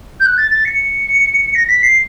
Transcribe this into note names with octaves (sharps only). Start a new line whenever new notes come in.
G6
F#6
A6
A6
C#7
A#6
B6
C7